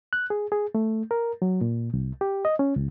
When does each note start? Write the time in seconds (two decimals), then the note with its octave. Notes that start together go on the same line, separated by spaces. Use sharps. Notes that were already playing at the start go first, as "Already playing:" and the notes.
0.13 F#6
0.30 G#4
0.52 G#4
0.75 A3
1.11 A#4
1.42 F#3
1.61 A#2
1.94 C2
2.21 G4
2.45 D#5
2.59 C#4
2.76 C#2